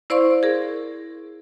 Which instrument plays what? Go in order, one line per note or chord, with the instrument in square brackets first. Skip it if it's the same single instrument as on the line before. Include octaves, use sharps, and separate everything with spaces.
[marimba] E4 C5 D5 F5 C6 C#6
G#4 A#4